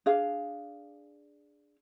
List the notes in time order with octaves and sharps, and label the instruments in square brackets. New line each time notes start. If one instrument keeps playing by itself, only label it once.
[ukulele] D4 G#4 F5